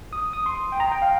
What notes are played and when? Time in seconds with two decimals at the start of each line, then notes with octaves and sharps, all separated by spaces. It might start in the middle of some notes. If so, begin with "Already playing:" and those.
0.13 D#6
0.33 D#6
0.46 C6
0.72 G5
0.80 A#5
0.92 G5
1.02 F5